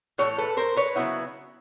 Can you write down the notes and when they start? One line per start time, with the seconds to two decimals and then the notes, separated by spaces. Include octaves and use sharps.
0.18 A2 E3 A3 C#5
0.38 A4 B4
0.57 A#4 C5
0.76 B4 C#5
0.96 C#3 F#3 B3 E4